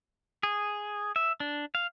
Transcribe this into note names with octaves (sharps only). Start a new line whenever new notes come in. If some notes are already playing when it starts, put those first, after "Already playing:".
G#4
E5
D4
F5